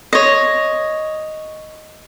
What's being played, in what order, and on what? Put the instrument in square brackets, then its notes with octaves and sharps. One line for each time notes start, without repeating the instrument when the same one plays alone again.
[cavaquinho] C#5 D#5